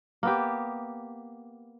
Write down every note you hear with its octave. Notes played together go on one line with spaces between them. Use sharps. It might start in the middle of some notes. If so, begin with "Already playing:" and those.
A#3 B3 G4